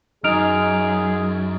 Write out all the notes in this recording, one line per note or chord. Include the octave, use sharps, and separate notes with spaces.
F#2 D#4 G#4 F6 D7 F7